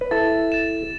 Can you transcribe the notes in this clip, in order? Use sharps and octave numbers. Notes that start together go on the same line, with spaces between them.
B4
E4 A4 A6 E7
A6 E7